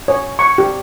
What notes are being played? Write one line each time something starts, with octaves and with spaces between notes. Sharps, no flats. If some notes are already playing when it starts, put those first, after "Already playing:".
C#5
C#6
G4